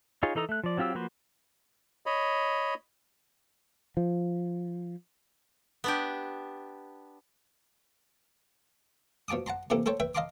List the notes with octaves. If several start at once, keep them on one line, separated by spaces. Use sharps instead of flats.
D#4 F4 G#4 C#5
E3 D#4 A4 A#5 D#6
A3 F#6
F3 D5
F#3 C4 F4 G4 E6
F3 A#3 F#4 B4 C5
C#5 D#5 B5
F3
B3 D4 G4
B2 F3 A5 D6 D#6
F#5 A5 A#5 C6
C3 E3 A#3 G4 A4
A4 C5 C#5 G5 A5
B4 E5 G5
D#5 F5 A5 A#5 C6 D6